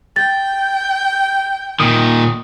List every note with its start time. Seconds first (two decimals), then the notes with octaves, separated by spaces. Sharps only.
0.16 G5 A6
1.80 A#2 D#3 D#6